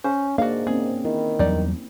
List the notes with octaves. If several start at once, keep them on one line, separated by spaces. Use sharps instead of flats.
C#4 C5
G#2 A#3 D4 F#4 D5 F5
A#3 C4 C#4 G#4
D#3 E4
E2 F#3 G3 D#4 D5